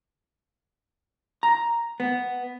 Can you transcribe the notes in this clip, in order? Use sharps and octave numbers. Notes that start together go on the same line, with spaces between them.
A#5
B3